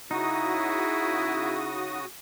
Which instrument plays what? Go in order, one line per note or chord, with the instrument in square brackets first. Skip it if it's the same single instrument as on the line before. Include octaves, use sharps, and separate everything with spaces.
[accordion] C#3 F#4 D#6 [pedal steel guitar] D#4 [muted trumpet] E4